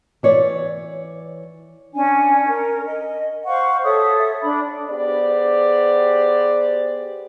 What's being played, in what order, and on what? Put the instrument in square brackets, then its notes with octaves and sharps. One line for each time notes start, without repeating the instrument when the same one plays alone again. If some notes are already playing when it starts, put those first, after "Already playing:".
[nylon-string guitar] E3 C#5 D5
[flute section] C#4 D4 G#5
A#4
D#5
C5 F5 F#5 C#6
A4 C#5 E5 D#6
D4 B5
[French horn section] B3 G4 G#4 C5 D5